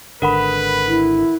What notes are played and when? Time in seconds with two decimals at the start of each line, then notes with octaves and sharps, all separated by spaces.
0.22 G#1 D3 A#4 B4 F#5 B5
0.88 E4